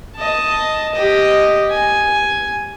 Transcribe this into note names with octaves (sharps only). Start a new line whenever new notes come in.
D#5 A5
G4 D#5
G#5